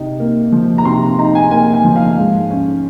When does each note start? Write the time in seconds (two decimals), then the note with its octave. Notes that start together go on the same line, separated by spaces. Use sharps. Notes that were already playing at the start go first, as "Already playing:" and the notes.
Already playing: C3 D#4
0.20 A#3
0.52 F3
0.78 A#5
0.85 C3 C6
1.18 D#4 A#5
1.35 G#5
1.51 A#3 G#5
1.73 G#5
1.84 F3
1.96 F5
2.18 G#2
2.50 C#4